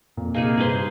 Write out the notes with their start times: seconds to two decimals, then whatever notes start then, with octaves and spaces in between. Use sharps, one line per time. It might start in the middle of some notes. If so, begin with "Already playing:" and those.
0.17 F2 A#2
0.34 C3 A#3 D#4 G#4
0.57 G2 C3 G#4 B4 C5